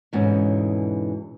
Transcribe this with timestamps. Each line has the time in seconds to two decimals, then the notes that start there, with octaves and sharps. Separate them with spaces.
0.13 E2 G#2 B2 D3 C#4